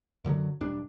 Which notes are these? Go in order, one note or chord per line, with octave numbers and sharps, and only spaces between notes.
F#2 D3 E3 F#3
E1 G2 D4